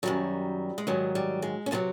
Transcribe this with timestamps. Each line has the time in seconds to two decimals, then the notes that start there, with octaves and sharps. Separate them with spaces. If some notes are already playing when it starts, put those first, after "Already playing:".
0.03 F#2 D#3 F#3 G3
0.78 G#3
0.87 G#2 D#3 F#3 G3
1.15 G3
1.42 G#3
1.66 C#4
1.71 C3 D#3 F#3 C4